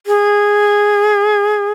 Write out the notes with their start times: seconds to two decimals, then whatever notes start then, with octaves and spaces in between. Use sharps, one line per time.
0.07 G#4